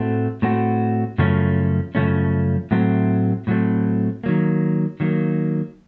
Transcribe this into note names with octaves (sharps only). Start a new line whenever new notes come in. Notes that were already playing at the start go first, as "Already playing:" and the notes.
Already playing: A2 A3 C4 F#4
A2 A3 C4 F#4
F#2 C#3 F3 A3 C#4
F#2 C#3 F3 A3 C#4
A2 F#3 A3 C4
A2 F#3 A3 C4
D#3 F#3 A#3
D#3 F#3 A#3